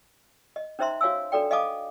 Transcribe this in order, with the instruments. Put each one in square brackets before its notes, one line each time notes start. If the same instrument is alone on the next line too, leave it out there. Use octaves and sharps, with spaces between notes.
[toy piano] D#5
C#4 D#4 C5 E5 A#5 C6
F#4 C#5 F5 G#5 E6
D4 F#4 A4 D5 G5
D#5 F5 G#5 A5 D6 D#6